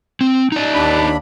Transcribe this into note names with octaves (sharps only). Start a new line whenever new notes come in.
C4
D#4 D5
D#2 D4 B5